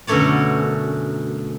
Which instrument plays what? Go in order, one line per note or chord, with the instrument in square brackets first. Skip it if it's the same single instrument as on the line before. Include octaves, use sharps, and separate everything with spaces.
[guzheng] F#2 B2 D3 A3 C#5 D5